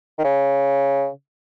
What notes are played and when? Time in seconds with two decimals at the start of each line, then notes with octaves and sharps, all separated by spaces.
0.19 D#3
0.24 C#3